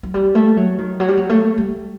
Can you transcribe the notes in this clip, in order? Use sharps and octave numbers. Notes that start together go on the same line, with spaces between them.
F#3
G3
A3
F#3
D#3
F#3
G3
F#3
A3
G3